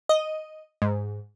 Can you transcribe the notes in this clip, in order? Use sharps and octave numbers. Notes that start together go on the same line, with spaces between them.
D#5
G#2